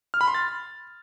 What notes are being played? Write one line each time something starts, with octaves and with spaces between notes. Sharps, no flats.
F6
B5
C6
A6